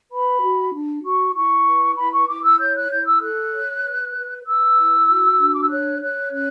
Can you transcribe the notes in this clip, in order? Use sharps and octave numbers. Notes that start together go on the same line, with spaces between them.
B4 B5
F#4
D4
F#4 C#6
E4 C#6
B4
E4 B5
C#6
E4 D6
E6
C#5 G6
F#6
E4 G6
E6
A4 F#6
C#5
B4
B4
B4 E6
E4
F#4
D4
D6
E6
C#5 F#6
C#5 F#6
C#4 F#6